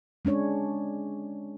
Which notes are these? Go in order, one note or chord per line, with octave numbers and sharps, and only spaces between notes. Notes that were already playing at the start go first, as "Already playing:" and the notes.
G#3 C#4 D4 C#5